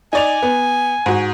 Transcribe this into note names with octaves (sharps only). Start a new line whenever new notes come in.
D#4 D5 G#5 F7
B3
G#2 F#4